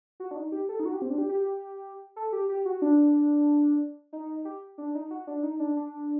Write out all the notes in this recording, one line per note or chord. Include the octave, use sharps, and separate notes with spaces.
F#4
D4
D#4
G4
A4
D#4
F#4
G4
C4
D4
G4
G4
G4
A4
G4
G4
F#4
D4
D#4
G4
D4
D#4
F#4
D4
D#4
D4
D4